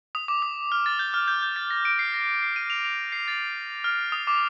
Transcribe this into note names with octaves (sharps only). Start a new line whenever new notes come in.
D#6
D6
D#6
F6
A6
G6
F6
G6
G6
A6
A#6
D7
C7
A#6
C7
D#7
F7
F7
C7
A6
F6
D#6
D6